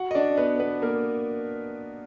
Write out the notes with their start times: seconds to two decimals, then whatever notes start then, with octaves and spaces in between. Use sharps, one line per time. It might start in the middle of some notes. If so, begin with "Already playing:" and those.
Already playing: F#4 F#5
0.11 D#5
0.15 D4 D5
0.37 B3 B4
0.60 B3 B4
0.82 A#3 A#4